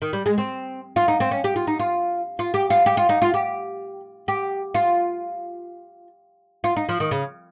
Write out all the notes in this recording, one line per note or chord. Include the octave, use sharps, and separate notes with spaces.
D#3
G3
G#3
C4
F4
D#4
C4
C#4
G4
F4
D#4
F4
F4
G4
F4
G4
F4
D#4
F4
G4
G4
F4
F4
D#4
F3
D#3
C#3